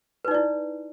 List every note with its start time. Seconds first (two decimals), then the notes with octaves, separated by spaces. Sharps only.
0.25 B4
0.28 D#4
0.31 D5
0.34 E4